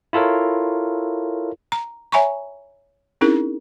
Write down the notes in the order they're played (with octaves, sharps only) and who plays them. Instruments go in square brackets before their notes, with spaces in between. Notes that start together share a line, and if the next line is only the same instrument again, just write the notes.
[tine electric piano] E4 F4 A4 A#4 C#5
[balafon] A#5
C#5 E5 G#5 A#5 B5 C#6
C4 C#4 D#4 E4 G#4 A#4